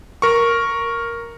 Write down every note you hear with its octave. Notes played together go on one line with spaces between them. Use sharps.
A#4 C#6